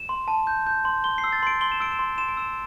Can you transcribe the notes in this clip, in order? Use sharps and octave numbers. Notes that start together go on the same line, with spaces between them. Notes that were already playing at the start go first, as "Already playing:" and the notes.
Already playing: E7
C6
A5
G6
G6
C6
C6 G7
C7
E6
A6
C6 D7
C6 G7
E7
E6 D7
E7
C6
C6 E7
D7
E6 E7